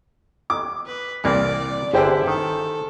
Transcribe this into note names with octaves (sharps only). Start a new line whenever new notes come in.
D6
B4
C2 E3 A#3 D5
G1 D3 E4 G#4 C5 G5
D#3 A4